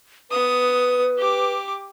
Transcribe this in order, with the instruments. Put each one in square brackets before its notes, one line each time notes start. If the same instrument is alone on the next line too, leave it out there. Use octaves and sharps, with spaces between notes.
[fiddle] B3 D#6 [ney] B4
[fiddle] G4 D6